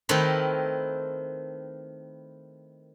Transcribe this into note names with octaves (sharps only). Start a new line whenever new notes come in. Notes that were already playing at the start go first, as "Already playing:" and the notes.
D#3 A3 C4 E4 A#4 B4